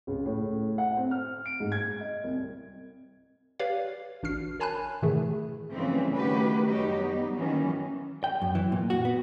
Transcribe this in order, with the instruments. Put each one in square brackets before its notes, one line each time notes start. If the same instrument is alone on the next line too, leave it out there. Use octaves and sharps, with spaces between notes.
[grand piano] C#2
A2
F#5
C4
F6
D7
G#2
G#6
D#5
C2
[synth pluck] G4 B4 C#5 D5 F5
A1 D4 F#4 F6 C7
A#4 C#5 G#5 A5 B5 F#6
A2 C3 D#3 E3 A3 G#4
[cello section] C#3 E3 F3 G3 A3 C4
D#3 A3 F#4 G4 B4
F#2 G3 D#4 F#4 G4 C#5
G3 B3 D#4
D#3 E3 F#3 A#3 B3 C#4
[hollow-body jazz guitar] G5
F#2
E3
A#2
F#4
B3